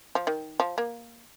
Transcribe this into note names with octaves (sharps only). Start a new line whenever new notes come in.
F3
D#3
F3
A#3